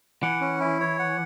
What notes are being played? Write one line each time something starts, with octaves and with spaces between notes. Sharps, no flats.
E3 F#5
C#4
E4
C#5
F#5